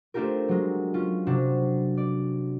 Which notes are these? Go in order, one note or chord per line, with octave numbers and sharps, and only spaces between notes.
A3 C4 D4 F4 G4 A#4
F#3 G#3
C#4 F4
C3 F#3 D4
D5